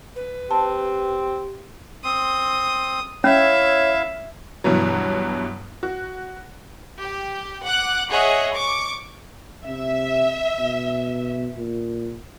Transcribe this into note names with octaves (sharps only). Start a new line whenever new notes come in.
B4
C4 G4 A5
C4 C6 D#6
C#4 E4 C#5 E5 F5
G2 B2 E3 F#3
F#4
G4
F#5 D6 F#6
G#4 C#5 D#5 E5 F#5
C#6 D6
C3 E5
B2
A#2